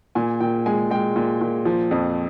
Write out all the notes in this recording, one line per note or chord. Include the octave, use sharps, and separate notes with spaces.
A#2 G#5
A#2 G5
G#3 G#5
G#3 G5
A#2
A#2
F3
F2